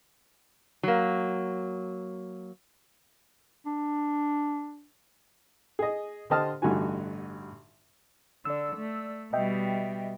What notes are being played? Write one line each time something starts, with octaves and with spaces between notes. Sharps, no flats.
F#3 A#3
D4
G#4 D#5
D3 G4 C5 D#5 A5 F6
A1 G2 D3 D#4 F#4 G#5
D3 D5 E6
A3
B2 G3 D#5 E5 G5